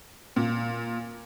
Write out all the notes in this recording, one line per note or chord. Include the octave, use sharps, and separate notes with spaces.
A#2